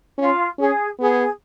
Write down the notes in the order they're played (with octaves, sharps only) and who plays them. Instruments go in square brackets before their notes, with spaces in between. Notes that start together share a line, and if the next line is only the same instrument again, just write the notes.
[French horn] C#4 [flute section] F4
[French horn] C#4 [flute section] G#4
[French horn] B3 [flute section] G#4